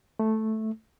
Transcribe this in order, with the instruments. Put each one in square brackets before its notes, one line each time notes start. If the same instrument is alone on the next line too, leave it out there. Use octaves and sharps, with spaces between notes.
[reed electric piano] A3